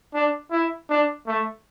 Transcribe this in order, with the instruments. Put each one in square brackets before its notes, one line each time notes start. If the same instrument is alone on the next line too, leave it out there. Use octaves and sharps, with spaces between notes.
[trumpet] D4
E4
D4
A3